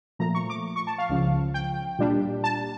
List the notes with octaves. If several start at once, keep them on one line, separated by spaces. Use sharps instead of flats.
A#2 F3 A3 A#5
C#6
D6
C#6
A5
F5
C#2 C#3 F3
G5
A#2 G3 D4
A5